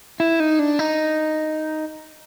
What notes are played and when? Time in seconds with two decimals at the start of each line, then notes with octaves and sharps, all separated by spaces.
0.20 E4
0.40 D#4
0.59 D4
0.79 D#4